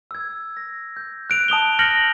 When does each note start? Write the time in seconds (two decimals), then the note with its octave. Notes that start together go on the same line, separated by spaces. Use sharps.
0.11 E6 G#6
0.57 A#6
0.97 G6
1.30 F#6 D7 F7
1.48 A5 D#6 F7 G7
1.79 F6 G6 A#6 C#7 F7 F#7